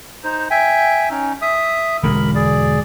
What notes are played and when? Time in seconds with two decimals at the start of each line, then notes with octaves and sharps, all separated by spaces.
0.24 D#4 C5
0.50 E5 G5 G#5
1.10 C#4 D#4
1.42 E5 D#6
2.03 E1 D3 G#3 A#4 B5
2.35 G#4 D5